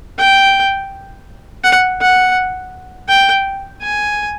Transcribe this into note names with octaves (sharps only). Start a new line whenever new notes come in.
G5
F#5
F#5
G5
G#5